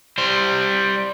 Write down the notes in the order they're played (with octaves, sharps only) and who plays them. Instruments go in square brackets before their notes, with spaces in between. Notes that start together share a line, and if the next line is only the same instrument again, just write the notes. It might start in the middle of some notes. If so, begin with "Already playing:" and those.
[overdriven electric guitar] G3 C5